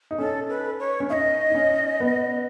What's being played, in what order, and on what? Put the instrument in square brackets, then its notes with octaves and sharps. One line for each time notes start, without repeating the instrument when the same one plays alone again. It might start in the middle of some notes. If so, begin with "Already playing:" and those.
[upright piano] D#4
[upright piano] C#4 [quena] A4
[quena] B4
C#5
[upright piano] C#4
[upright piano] D#4 [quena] D#5 F5
[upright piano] D#4
C#4
B3